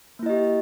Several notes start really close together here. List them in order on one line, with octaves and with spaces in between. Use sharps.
A#3 E4 D#5 G4